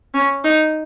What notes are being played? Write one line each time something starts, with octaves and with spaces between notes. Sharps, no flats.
C#4
D#4